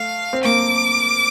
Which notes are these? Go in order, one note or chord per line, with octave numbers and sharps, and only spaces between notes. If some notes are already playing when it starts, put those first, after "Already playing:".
Already playing: A3 F5
C4
A#3 D6